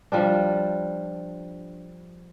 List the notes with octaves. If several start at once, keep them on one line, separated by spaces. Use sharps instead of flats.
F3 G3 D4